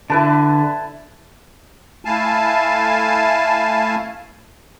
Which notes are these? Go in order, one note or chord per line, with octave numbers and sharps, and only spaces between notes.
D3 E4 B4 A5
A3 E4 F5 G#5 A5